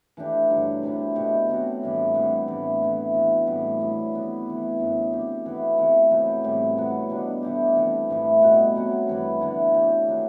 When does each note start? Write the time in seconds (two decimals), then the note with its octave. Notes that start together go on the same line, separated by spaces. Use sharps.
0.17 E3 A3 D4 G4
0.50 G2 D3 F#3
0.83 C3 G3 C4 E4
1.15 B2 A3 E4 G4
1.49 F#3 C4 F#4
1.82 A2 E3 G3 D4
2.14 C3 G3 B3
2.48 A2 E3 A3 E4
2.82 E3 A3 E4
3.14 E3 B3 F#4
3.47 A2 G3 C4 E4
3.80 F#3 B3 E4
4.14 C3 E3 B3
4.46 E3 A3 E4
4.79 F#2 D3 F#3 B3
5.12 F#3 C4 G4
5.46 E3 B3 E4
5.78 C3 E3 A3 E4
6.11 C3 F#3 B3 E4
6.44 A2 E3 G3 C4
6.77 F#3 B3 F#4
7.10 B2 G3 D4
7.43 B2 A3 E4 G4
7.76 E3 A3 C4
8.10 A2 E3 A3 E4
8.42 B2 G3 B3 F#4
8.75 F#3 C4 F#4
9.07 G2 E3 B3
9.41 D3 A3 E4
9.74 F#3 C4 E4 G4
10.08 F#3 B3 D4